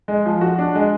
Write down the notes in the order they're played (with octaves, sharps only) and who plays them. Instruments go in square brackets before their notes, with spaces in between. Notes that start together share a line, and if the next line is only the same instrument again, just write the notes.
[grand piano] G#3
F3
F#4
D4
G#3